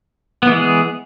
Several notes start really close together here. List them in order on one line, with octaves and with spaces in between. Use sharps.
B3 E3 G#3 G#4